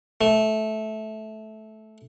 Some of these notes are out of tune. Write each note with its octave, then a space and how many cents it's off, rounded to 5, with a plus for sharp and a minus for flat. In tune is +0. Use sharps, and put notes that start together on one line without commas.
A3 -15